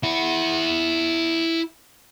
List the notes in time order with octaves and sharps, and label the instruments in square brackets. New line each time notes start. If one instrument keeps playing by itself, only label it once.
[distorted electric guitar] E4 F#5